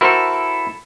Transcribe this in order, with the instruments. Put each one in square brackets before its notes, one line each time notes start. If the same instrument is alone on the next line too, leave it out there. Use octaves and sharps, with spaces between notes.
[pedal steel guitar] E4 A4 [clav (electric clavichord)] F#4 A#4 C5